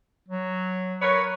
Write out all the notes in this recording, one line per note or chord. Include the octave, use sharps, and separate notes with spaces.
F#3
A#4 B4 C#5